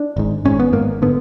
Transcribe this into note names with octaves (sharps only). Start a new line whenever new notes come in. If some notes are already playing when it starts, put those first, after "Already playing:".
Already playing: D4
G#1 G#2
G#1 G#2 C#4
B3
G#1 G#2 A#3
D3 B3